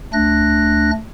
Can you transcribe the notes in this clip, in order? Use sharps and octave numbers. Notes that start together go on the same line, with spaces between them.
D2 A3 D4 F#6 A#6